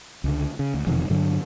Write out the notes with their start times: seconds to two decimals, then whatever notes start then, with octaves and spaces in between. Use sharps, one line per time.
0.24 C#2 D3
0.59 C#3
0.74 D2
0.87 E1 F2 C3 D#3
1.10 G2 D3 F#3 D4